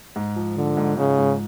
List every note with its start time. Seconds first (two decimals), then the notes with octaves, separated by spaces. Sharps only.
0.16 G#2
0.36 F3
0.57 D3 F3
0.77 G#2
0.97 G#2 C#3
1.18 G#2